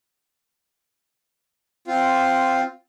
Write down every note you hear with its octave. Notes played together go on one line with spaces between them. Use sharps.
C4 F4